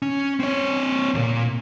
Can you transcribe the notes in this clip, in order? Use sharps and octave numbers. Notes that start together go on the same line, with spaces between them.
C#4
C4 C#5
D2 A#2